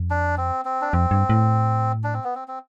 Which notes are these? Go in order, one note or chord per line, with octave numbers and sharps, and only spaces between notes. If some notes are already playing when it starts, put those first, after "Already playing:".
Already playing: F2
D4
C4
C4
D4
F2 C4
G2
A2
D4
C4
B3
C4
C4